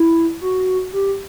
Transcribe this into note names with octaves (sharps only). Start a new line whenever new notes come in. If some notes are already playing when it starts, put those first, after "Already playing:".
Already playing: E4
F#4
G4